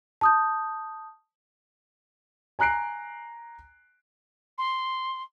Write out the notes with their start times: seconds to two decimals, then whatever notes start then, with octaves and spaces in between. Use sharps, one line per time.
0.21 A5 D#6 G6
2.59 G#5 A#5 F#6 C7 D7
4.58 C6